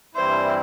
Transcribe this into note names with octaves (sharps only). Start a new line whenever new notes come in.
G2 E3 G3 C4 E4 C5